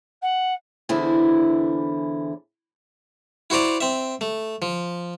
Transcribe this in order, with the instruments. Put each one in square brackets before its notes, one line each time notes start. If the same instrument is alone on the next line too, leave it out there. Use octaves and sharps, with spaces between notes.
[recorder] F#5
[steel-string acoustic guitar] E2 D3 E3 E4 C5
[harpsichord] E4 F#4 C5 D5 A#5
C4 E5
A3
F3